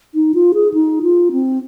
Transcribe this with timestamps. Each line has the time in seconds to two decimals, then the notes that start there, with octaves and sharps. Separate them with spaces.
0.15 D#4
0.34 F4
0.54 G#4
0.73 D#4
1.02 F4
1.32 C4